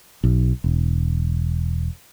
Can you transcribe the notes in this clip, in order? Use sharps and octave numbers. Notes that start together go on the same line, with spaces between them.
B1
E1